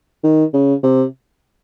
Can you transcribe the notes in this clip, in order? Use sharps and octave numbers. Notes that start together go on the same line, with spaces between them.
D#3
C#3
C3